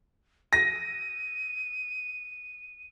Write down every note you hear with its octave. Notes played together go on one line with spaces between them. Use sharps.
A#6 D#7